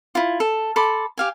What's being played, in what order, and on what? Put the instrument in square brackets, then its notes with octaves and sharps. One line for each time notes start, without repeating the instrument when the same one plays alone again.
[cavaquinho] E4 F4
A4
A4 B5 C6 D6
G4 F5 G#5